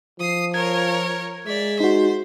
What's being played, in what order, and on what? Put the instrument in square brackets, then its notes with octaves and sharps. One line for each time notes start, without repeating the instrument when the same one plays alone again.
[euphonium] F3 [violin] D#6 C7
[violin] A#4 C#5 [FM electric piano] G#6
[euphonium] G#3 [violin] D5 E5
[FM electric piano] D#4 F#4 [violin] C5